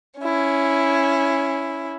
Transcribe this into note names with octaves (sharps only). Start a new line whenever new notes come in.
C#4 E4